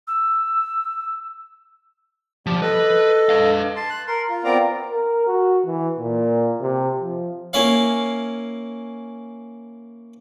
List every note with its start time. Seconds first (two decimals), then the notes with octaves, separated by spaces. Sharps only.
0.07 E6
2.46 F3 G3 G4
2.62 A4 B4 D#5
3.29 B4 F5
3.76 A5 C6
3.90 F#6
4.07 A#4 C6
4.29 F4
4.44 B3 C4 F4 A#4 D5 A#5
4.90 A#4
5.27 F#4
5.66 E3
5.99 A#2
6.60 C3
7.01 F3
7.53 A#3 C#4 E4 C#5 F5